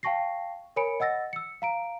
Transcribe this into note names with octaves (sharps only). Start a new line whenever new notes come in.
F5 G5 A5 C#6 A#6 C7
A#4 C#5 G#5 B5 C#7 D7
D#5 F#5 E6 A6 A#6
E6 C#7
F5 A#5 D7